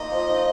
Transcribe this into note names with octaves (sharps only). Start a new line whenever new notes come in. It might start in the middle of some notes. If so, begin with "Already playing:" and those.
Already playing: A#3 D#4 F4 D#5
F3
D#3